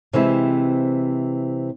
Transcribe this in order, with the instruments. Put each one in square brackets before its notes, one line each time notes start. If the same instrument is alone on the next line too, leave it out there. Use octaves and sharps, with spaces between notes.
[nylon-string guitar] C3 E3 G#3 C4 E4